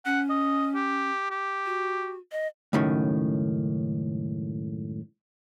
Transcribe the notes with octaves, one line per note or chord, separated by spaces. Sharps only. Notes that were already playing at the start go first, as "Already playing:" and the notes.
C#4 F#5
D#5
G4
G4
F#4
D#5
C#2 F#2 A2 D#3 C#4